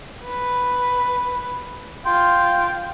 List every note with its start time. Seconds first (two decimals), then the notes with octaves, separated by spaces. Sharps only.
0.25 B4
2.05 F4 G5 C6